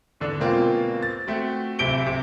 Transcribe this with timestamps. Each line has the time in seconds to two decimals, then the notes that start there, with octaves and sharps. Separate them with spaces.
0.20 E2 D3 D4
0.40 B2 G#3 A#3 C4 F4
1.03 A6
1.27 A3 C4 F#4
1.79 D1 C3 D7 G7
2.06 C3